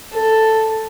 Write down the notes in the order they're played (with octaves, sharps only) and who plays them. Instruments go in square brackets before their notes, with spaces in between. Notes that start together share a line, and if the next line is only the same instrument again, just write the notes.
[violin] A4